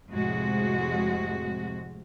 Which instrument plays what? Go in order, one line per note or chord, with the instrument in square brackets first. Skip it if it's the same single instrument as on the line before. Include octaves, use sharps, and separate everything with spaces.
[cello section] F2 A2 C3 G#3 F#4